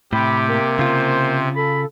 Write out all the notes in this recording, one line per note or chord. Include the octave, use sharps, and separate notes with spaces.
A2 C3 G4 B5
A#3
C#3 F4 C5
A4 B5